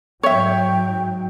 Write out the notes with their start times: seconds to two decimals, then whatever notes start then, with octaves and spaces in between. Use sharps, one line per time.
0.23 G#2 F#3 C#5 E5 G5 C#6